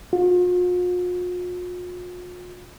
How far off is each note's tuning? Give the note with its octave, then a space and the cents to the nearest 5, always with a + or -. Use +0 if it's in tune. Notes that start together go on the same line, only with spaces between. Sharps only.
F4 +45